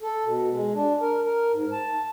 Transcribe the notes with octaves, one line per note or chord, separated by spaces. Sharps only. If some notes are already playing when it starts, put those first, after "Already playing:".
A4
B2
G#3
D4
A#4
A#4
G#2
A5